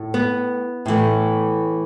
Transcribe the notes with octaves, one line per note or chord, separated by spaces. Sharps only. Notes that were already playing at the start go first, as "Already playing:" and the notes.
Already playing: A2
B3
A2 E3 A3